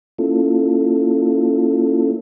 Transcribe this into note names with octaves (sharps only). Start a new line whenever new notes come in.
A#3 C#4 E4 F4 A4